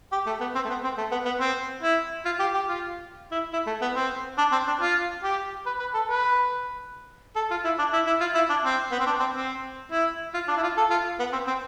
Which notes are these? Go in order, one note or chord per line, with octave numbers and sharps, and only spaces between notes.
G4
A3
B3
C4
A3
B3
C4
A3
B3
B3
C4
E4
F4
G4
G4
F4
E4
E4
A3
B3
C4
D4
C4
D4
F4
G4
B4
B4
A4
B4
A4
F4
E4
D4
E4
E4
F4
E4
D4
C4
B3
C4
D4
C4
C4
E4
F4
D4
E4
F4
A4
F4
B3
C4
C4